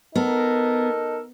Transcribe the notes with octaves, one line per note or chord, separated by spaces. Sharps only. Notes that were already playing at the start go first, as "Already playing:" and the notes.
B3 D#4 A4 A#4